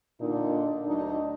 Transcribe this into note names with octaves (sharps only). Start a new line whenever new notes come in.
A#2 D3 D4 D#4
D2 F#3 D4 D#4